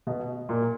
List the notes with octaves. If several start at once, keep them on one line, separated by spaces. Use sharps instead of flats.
B2
A#2